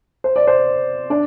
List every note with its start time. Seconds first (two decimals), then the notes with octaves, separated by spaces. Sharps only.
0.24 C5
0.36 D5
0.47 C5
1.10 D4 D5